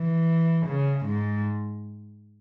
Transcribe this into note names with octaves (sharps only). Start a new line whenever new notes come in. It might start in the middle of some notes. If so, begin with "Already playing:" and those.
Already playing: E3
C#3
G#2